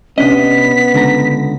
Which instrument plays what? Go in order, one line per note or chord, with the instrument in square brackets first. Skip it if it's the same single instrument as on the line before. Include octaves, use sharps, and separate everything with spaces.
[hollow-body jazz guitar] C3 D4 D#5 [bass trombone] B3 [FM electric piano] C#4 [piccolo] B6
[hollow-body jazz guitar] C#2 D3 A#5